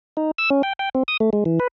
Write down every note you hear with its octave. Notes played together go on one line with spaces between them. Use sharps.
D#4
E6
C#4
G5
G5
C4
D#6
A3
G#3
E3
B4